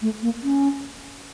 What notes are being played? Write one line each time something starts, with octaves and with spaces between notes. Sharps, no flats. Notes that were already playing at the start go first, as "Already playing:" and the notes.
A3
A#3
C#4